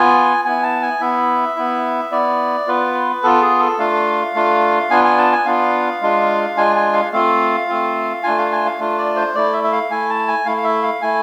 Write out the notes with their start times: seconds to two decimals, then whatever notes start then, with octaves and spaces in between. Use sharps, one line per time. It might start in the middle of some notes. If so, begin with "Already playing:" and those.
Already playing: B3 F4 G#5
0.45 B3 E4 G#5
0.63 A5
0.82 G#5
1.00 B3 E4 E5
1.57 B3 E4
2.12 B3 E4 D5
2.68 B3 F4 B4
3.23 B3 F4 A4
3.42 G#4
3.60 A4
3.78 A3 D4 F4 F5
4.35 A3 D4 F4
4.90 B3 D4 F4 G#5
5.04 G#5
5.18 A5
5.32 G#5
5.45 B3 D4 F4 F5
6.01 G#3 D4 F4
6.57 G#3 D4 F4 G#5
6.76 G#5
6.94 F5
7.12 A3 C4 F4 F5
7.68 A3 C4 F4
8.23 A3 D4 F4 G#5
8.38 F5
8.52 G#5
8.65 F5
8.79 A3 D4 F4
8.98 D5
9.16 C5
9.35 A3 E4 D5
9.53 E5
9.64 E5
9.72 F5
9.90 A3 E4 G#5
10.10 A5
10.28 G#5
10.45 A3 E4 F5
10.57 F5
10.64 E5
10.83 F5
11.02 A3 E4 G#5